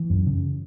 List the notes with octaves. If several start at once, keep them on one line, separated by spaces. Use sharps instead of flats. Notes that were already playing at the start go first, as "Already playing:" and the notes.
Already playing: E3
F#2
C#3